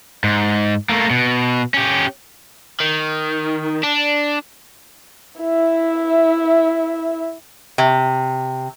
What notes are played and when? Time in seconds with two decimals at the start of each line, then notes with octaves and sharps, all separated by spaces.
0.24 G#2
0.89 A3 A#3
1.11 B2
1.74 C#4 G4
2.80 D#3
3.83 D4
5.41 E4 E5
7.78 C3